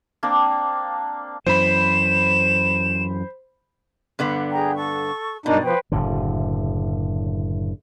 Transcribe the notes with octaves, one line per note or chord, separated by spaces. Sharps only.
A#3 C4 D4
F#2 E3 C5 B5 E7
G2 D3 B3
G#4 G5 A#5
A4 C#6
G2 B2 D4 D#4 A#4 D5
F3 B4 C5 G5
F#1 A2 D3